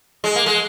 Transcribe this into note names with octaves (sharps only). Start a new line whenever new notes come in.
G#3
A#3
G#3